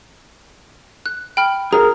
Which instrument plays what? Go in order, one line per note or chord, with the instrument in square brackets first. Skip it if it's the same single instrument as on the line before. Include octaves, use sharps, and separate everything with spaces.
[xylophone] F#6
G5 B5 F6
[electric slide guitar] G#4 A#4 [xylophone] A#5